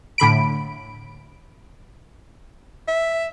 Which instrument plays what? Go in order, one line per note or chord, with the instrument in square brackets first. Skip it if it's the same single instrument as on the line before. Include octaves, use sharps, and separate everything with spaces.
[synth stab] A2 D3 B5 D7
[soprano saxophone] E5